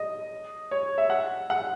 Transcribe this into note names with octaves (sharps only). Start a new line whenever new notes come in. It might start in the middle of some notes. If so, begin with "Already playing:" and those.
Already playing: D#5
C#5
E5
F#5
F#5